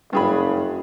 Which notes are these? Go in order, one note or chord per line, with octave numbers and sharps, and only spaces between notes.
F#1 G2 G#4 B5